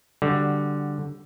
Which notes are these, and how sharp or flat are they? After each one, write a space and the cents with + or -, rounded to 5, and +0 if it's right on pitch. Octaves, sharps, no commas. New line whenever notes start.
D3 +0 G3 +0 F#4 +0